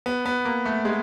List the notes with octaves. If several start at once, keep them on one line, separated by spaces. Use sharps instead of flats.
B3
B3
A#3
A3
G#3